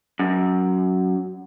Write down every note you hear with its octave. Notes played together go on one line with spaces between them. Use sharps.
F#2